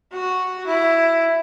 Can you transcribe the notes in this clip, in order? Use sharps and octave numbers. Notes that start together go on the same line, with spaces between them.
F#4
E4